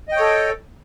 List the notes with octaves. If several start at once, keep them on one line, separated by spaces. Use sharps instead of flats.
A4 C#5 D#5 G5